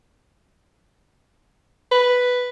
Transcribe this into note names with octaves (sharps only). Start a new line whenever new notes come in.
B4